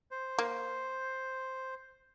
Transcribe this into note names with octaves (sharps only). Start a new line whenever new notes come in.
C5
A#3